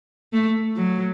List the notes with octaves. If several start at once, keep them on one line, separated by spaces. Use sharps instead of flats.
A3
F#3